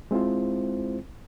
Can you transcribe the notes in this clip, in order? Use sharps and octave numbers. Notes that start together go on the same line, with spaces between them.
G#3 C4 E4 F4 C5